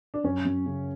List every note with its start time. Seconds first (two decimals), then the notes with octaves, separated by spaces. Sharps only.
0.14 D4
0.24 F#2 C#4
0.45 F#2
0.66 C#3